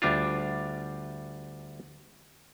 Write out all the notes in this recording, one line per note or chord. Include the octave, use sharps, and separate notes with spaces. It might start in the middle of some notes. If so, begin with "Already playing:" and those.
D2 G3 D4 F4